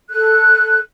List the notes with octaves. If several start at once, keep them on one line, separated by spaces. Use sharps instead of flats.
A4 F#6